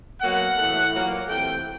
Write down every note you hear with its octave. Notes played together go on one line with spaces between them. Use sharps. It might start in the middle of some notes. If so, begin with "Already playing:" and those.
B2 F#3 A#3 F#5
A2 E3 A3
A#2 F#3 A#3
C3 E3 A3 G5